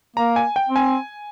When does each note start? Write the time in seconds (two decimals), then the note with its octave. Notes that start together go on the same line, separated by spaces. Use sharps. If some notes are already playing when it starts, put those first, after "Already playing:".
0.16 A#3 A#5
0.36 G#5
0.56 G5
0.69 C4
0.76 G#5